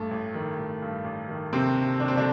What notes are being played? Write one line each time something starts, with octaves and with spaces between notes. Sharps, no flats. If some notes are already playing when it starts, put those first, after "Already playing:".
Already playing: A1 G2 A3
A1
D#3
A1
G2
A1
D#3
D#2 C3 C4
D3
D#2 D4
C4
D3 D4